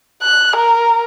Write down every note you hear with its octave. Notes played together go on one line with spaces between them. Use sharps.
F#6
A#4